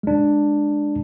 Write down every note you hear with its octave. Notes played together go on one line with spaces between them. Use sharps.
G#3 D4